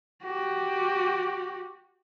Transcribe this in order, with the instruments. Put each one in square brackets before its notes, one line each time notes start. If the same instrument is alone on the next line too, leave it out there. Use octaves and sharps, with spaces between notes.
[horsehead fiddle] F#4 G4